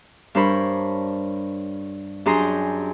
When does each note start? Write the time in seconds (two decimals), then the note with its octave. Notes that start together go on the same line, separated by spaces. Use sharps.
0.35 G2 D4 A#4 C5 C#5 B5
2.26 F#2 D4 G4 G#4 A#5 C6